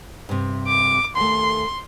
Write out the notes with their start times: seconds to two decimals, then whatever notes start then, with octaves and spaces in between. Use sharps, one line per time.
0.29 G2 C3
0.68 D6
1.17 D#2 A3 C6